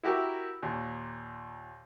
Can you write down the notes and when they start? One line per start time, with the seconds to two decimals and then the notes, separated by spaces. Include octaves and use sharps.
0.03 E4 F#4 G4 A#4 E5
0.62 D#2 A#2